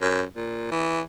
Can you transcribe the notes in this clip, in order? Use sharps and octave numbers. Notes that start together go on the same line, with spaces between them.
F#2
A#2
E3